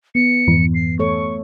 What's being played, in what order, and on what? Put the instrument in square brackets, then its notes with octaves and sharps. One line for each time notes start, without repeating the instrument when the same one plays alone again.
[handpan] B3 [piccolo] C#7
[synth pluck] F2 G#2 E3
[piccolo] C7
[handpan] A3 A4 C#5 [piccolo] C#6